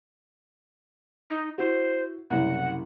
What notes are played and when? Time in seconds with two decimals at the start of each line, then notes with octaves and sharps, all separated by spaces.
1.30 D#4
1.58 E4 F#4 C5
2.30 F#1 C2 F#5